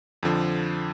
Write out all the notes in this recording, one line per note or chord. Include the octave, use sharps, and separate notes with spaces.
F2 D3 F3